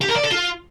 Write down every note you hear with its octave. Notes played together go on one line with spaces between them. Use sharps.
G4
A#4
D5
A4
F4